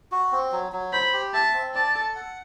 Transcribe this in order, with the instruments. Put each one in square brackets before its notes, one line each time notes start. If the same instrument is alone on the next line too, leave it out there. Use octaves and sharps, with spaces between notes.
[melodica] F#4
C4
F#3
F#3
[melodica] C5 [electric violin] B5
[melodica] G4
[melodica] E5 [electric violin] A5
[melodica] C4
[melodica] D5 [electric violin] A5
[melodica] A4
F#5